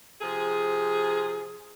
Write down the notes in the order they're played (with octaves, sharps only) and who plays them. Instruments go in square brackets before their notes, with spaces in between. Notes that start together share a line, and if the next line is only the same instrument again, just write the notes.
[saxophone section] C3 F3 G#4